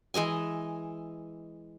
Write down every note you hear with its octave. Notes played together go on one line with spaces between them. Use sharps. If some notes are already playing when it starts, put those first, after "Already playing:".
E3 G#3 D#5 G#5